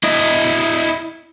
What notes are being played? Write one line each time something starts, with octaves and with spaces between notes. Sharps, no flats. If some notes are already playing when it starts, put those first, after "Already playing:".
E4 D#5